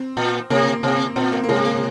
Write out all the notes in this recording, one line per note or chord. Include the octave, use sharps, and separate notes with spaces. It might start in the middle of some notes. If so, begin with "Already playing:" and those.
Already playing: C4
A#2
C3 A#3
C3 C4
A#2 C4
A#3
A#3
C3 G#3
A#3